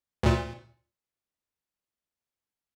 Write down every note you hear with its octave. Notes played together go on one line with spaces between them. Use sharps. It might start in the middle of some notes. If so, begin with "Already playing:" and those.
D2 A#2